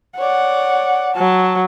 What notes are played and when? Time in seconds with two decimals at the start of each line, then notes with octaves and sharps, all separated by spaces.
0.18 C#5 D5 F#5
1.16 F#3 A5